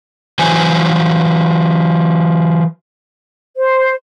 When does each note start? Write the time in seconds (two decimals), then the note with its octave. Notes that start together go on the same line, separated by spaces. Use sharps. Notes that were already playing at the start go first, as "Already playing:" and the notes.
0.39 E3 F#3 C5 G#5
3.56 C5